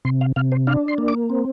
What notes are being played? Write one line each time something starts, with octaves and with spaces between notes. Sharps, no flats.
C3 C6
F5
C3 F5
C5
D4 F5
C6
A#3
D6
C4